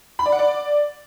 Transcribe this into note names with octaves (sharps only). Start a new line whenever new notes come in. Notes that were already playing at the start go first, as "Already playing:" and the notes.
B5
D5
F#5
D5